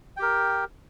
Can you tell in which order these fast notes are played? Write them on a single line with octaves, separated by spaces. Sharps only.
G5 G4 A#4